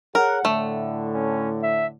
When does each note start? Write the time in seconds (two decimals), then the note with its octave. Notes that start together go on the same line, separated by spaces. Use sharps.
0.15 G#4 A#4 C#5 F#5
0.45 A2 D3 A3
1.14 C#4
1.63 E5